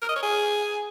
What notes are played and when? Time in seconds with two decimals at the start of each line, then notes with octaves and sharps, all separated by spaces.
0.02 A#4
0.09 D#5
0.16 C#5
0.23 G#4